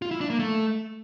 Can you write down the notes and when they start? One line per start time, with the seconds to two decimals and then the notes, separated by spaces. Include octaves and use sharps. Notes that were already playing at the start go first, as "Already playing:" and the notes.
0.02 F4
0.11 E4
0.21 D4
0.30 A#3
0.39 A3